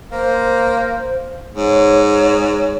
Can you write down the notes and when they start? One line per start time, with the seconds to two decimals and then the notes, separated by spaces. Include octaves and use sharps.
0.12 A#3 C5
1.55 G#2 C#5